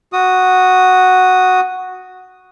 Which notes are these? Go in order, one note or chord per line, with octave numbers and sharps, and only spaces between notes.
F#4 D#6